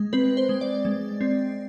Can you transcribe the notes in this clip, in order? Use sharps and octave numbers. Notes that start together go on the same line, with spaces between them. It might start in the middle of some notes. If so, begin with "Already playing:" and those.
Already playing: G#3
C4 B4
C5
G#3
D5
G#3
C4